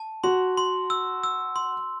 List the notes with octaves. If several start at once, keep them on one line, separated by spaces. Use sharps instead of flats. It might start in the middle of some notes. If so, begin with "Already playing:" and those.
Already playing: A5
F#4 C6
C6
E6
E6
C6